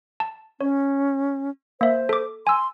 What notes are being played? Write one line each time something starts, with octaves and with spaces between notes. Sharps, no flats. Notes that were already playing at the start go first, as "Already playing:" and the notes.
A5
C#4 C#5
A#3 C5 E5
A4 D6
G#5 C6 E6